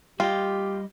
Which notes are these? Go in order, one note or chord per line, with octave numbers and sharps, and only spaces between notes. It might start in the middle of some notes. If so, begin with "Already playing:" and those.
G3 F4 G4 D#5 G5